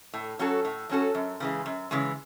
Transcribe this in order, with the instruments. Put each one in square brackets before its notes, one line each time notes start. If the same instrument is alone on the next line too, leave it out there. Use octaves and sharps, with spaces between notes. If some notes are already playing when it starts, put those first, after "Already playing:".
[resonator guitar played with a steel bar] A2
F#3 C#4 F#4 A4
A2
F#3 C#4 F#4 A4
F#2
C#3 E3 G#3
F#2
C#3 E3 G#3